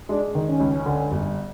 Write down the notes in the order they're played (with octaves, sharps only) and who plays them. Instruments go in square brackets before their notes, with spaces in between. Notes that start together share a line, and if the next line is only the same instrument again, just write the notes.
[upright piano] G#3 [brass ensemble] D4
[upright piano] D#3
[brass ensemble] C#4
[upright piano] C#2
D3
G1